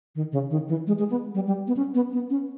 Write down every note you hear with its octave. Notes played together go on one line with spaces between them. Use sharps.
D#3
C#3
D#3
E3
G#3
G#3
B3
G3
G3
B3
C#4
B3
B3
C#4